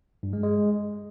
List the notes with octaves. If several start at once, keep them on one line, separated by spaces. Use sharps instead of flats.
G2
G#3
G#3